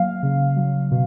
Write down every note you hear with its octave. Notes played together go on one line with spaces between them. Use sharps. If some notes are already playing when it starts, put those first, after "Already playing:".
Already playing: F#3 A#3 F5
C#3
F#3
B2